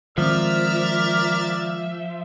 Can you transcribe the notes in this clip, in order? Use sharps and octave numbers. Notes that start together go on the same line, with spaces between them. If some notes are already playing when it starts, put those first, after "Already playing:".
D#3 F3 G#3 C4 A#4 D5 E5 F6